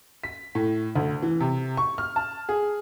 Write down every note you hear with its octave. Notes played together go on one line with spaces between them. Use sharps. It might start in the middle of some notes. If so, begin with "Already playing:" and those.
B6
A2
D2
E3
C3
C#6
F6
A5
G#4